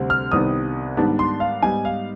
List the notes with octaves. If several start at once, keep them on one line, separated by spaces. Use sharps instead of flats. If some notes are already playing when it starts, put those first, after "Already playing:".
Already playing: D2 C3 G3 C4
F6
C2 C3 D#3 B3 D#6
G#2 D#3 G3 B3 D4
C6
F5
G#2 G3 B3 D#4 G#5
F5